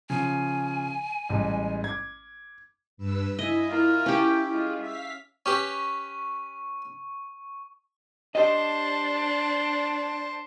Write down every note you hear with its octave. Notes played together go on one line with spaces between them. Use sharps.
C#3 F3 G#5
A1 G3 G#3
D6 G#6
G2 B4 E6
E4 D#5 E5 G#5
A#3 F4
C#4 G4
G#3 F4
E5 F5 B6
C#4 G4 B4 C#6
D4 G4 C5 D#5 A5